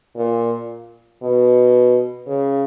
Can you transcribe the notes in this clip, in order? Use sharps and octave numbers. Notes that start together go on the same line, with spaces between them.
A#2
B2
C#3